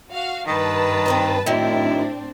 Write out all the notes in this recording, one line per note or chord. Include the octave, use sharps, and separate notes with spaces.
F#4 F5
G2 D#3 B4 A5
C4 D4 D#4
F#2 A2 D#3 C4 D4 E4